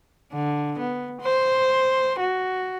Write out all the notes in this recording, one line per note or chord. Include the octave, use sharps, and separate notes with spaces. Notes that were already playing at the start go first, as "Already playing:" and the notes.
D3
B3
C5
F#4